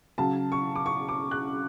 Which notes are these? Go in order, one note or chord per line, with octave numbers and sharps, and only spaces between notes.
C#3 F#3 A5
C#6
D6
C#6
D6
F#6